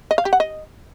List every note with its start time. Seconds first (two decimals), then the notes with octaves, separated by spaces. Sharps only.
0.11 D#5
0.18 F5
0.25 G4
0.33 F#5
0.40 D#5